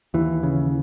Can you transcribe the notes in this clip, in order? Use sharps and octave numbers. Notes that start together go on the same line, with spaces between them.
D#2 E3
C#3